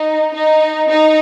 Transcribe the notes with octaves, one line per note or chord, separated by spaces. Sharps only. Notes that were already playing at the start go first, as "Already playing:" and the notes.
Already playing: D#4
D#4
D#4